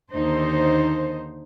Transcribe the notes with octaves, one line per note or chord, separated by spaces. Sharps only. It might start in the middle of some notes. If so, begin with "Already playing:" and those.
D#2 D3 D#4 C5